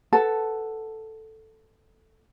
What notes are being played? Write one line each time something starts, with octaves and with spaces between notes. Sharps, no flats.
A4 B4 F#5 A5